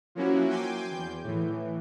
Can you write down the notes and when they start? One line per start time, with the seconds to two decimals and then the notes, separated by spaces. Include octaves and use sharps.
0.15 F3 F#3 A#3 C#4 E4 F#4
0.49 G5 G#5 C6 D6 G6
0.91 E2 G6
1.24 A2 E3